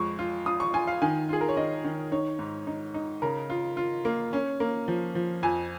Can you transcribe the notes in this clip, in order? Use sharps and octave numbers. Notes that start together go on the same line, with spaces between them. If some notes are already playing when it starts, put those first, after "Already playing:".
Already playing: F2 G#3 C#6
F4
F4 D#6
C#6
F4 G#5
F5
D#3 G#5
F4 G#4
A#4
C#5
D#3 D#5
D#3
D#4 C#5
G#2
D#4
D#4
C#3 A#4
F4
F4
A#3
C#4
A#3
F3
F3
F2 G#5